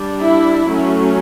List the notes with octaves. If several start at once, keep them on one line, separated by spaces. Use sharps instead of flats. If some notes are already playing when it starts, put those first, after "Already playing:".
Already playing: G3 D4
E4
F#3 A3 C#4